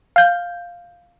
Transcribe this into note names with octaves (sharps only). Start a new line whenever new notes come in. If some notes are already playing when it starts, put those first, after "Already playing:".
F5 G6